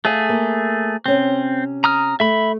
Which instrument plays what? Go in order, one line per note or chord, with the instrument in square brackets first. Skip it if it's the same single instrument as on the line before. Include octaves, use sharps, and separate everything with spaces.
[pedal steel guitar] A3 G#4 [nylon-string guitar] F5 G#5
[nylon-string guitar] A#3
[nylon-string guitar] C3 C#4 [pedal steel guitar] C4
[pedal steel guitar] A#5 D#6 F6
[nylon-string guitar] A3 [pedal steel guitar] E5 B5